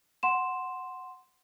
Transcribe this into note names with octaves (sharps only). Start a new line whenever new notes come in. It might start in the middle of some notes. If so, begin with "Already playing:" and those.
F#5 C6 E7